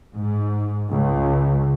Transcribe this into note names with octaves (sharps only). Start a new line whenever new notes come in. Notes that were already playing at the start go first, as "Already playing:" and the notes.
G#2
C#2